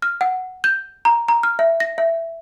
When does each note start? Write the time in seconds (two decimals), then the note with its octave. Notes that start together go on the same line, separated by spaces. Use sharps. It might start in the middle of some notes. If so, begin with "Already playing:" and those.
0.02 F6
0.21 F#5
0.64 G6
1.05 A#5
1.28 A#5
1.43 F6
1.59 E5
1.80 A#6
1.98 E5